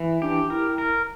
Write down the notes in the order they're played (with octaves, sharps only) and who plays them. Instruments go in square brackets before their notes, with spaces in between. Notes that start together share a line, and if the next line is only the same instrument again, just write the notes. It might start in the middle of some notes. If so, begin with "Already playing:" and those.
Already playing: [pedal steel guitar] E3
[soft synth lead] D4 [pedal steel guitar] G4
[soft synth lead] E4 [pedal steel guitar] A#4
[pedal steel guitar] A#4